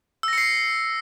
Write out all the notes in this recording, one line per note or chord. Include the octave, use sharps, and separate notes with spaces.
E6 A#6 C7 C#7